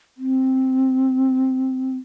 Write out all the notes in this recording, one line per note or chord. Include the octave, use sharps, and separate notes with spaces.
C4